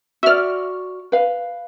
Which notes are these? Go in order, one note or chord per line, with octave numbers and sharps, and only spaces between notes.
F#4 D5 E5 F6
B4 F5